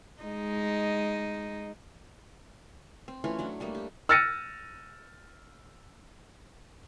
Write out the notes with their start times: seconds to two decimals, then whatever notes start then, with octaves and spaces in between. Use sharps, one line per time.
0.23 G#3 D#4
3.08 C4
3.24 E3 A3 C#4 F4
3.39 F#3 A3 D4
3.60 G3 A3 A#3
3.75 G4
4.09 E6 F6 A6 A#6 C#7 D#7